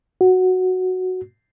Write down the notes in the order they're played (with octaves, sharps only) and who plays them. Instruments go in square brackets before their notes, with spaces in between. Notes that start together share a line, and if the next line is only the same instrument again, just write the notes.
[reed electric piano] F#4